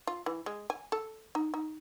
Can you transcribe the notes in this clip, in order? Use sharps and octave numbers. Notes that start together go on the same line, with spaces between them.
F4
E3
G#3
G#5
A4
D#4
D#4